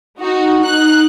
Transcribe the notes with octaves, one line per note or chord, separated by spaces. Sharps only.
D#4 F#4
D#4 F#6